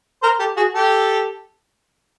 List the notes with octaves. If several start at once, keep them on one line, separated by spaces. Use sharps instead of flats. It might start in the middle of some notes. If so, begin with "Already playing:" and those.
A#4 C5
G4 A4
F#4 G#4
G4 A4